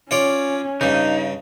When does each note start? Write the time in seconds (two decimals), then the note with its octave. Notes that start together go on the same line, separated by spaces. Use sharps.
0.11 C#4 F4 C#5 D5
0.81 G2 C#3 D#4